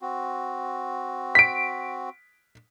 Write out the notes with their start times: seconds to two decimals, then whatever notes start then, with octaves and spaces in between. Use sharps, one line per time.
0.02 C4 F#4
1.35 B6 D7